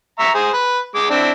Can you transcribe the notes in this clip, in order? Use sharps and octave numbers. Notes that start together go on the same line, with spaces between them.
E5 A#5 C#6
G#4 C5
B4
G#3 D6
C4 D4 E4